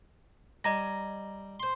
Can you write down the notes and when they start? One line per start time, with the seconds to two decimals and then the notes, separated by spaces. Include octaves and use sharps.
0.64 G3 D#5 A#5 A#6
1.60 C5 C6